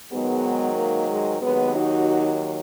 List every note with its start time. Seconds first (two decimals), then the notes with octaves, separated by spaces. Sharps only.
0.12 G#2 D#3 F#3 G#3 B3
0.77 A#3
1.09 G#3
1.41 D#2 D#3 F#3 G#3 B3
1.74 D#4 F#4